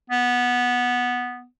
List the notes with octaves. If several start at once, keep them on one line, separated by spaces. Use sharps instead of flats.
B3